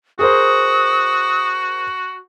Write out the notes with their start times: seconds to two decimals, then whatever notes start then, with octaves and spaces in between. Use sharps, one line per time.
0.19 F#4 G#4 A#4 C5 D#6